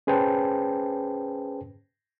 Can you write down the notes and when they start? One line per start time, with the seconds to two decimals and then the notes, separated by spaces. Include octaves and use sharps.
0.07 C#4 G#4 B4 C5 G5 A5